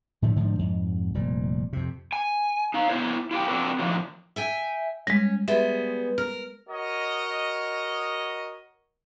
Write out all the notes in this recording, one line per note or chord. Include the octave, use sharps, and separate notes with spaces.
A2 D3 F3 A3
G#2 D3 D#3 F3
F2 G#2
F1 A#2 G3
F2 C3
G#5
D#4 F5
B3 E4 C5 C#5
E4 F4 G4 G5
C4 D4 F4 F#4 A4 B4
A2 D3 D#3 F3 F#3
E5 G5 G#5
G3 G#3 C#4
G3 G#3 B3 E5
A#4 F6
F#4 A#4 C#5 D#5